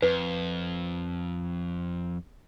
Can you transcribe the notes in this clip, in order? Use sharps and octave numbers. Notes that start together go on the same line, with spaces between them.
F2 B4